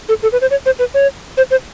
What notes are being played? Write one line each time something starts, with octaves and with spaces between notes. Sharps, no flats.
A4
A4
B4
C5
C#5
C5
B4
C#5
C5
C5